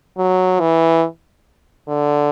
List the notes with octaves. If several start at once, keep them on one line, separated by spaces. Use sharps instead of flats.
F#3
E3
D3